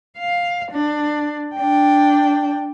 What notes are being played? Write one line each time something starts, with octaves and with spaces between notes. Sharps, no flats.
F5
D4
D4 G5